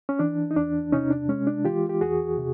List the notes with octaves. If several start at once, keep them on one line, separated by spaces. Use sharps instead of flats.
C#4
E3 D4
D#4
E2 D4
C3 C#4 D#4
D4
G#3 C#4
D4
E3 F4 G4
G4
E2 F#4 G#4
C3